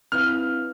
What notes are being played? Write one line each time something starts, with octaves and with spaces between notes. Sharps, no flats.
C4 E4 B4 F5 F6